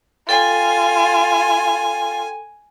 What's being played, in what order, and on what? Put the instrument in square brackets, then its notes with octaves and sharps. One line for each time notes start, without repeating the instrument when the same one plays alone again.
[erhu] F4 [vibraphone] A4 G5 [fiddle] G#5